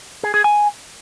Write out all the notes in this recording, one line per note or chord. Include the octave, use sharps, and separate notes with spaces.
G#4
G#4
G#5